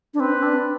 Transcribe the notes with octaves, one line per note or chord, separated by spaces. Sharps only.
D4
C4 B4
D4